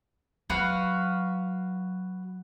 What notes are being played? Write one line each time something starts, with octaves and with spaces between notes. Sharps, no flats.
F#3 F#4 B4 F5